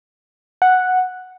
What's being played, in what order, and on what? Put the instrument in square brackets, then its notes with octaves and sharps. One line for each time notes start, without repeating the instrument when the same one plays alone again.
[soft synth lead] F#5